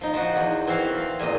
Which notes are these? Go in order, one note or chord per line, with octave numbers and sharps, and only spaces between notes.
F3 D#4
F3 F#4
E2
E3 C4 F#4 F5
F5
E2 A#2 D#5